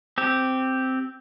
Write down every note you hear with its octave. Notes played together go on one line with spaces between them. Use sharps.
C4 G4